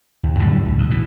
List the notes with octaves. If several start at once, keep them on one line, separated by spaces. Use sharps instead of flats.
D#2
F#2 A2 D3 G3
B1
D2
B2 E3